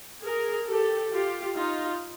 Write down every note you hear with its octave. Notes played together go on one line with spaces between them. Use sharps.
G#4 A#4
G4 A4
F4 G4
D#4 F4